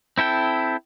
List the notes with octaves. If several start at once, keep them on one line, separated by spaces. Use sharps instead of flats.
C4 E4 A4 G5